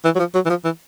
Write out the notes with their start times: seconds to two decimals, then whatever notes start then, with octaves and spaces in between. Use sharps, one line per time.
0.05 E3
0.15 F#3
0.19 F3
0.34 F#3
0.46 E3
0.49 F3
0.65 E3